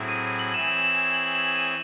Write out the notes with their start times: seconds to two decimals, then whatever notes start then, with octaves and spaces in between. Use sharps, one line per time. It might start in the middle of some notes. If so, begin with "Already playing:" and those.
Already playing: A2 F#3 C4 E4 G#4
0.09 D#7
0.25 D#7
0.39 F#7
0.54 E3 C4 E4 G#4 C#5 E7
0.84 E7
1.14 F#7
1.35 E7
1.55 D#7